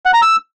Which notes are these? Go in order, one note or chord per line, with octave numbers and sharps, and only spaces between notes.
F#5
A#5
E6